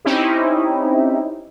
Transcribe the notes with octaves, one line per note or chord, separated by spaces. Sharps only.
C4 C#4 D#4 E4 G4